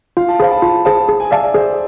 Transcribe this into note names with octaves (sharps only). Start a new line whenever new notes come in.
F4 F5
A5
G#4 C5 F5 B5
A5
F4 A5
G#4 C5 F5 A5
G#4
G#5
D5 E5 F5 A5
D5
G#4 C5